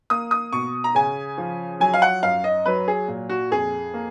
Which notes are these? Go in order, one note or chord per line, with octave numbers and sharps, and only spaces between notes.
A#3 D#6
D#6
B2 C#6
A#5
C#3 G#5
F3
F#3 G#5
F5
F#5
F#2 F5
D#5
F#3 B4
G#4
A#2
F#4
F2 G#4
A#3